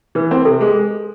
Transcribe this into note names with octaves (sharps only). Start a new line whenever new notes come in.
E3 B4
C4 A#4
C3 A4
G#3 G#4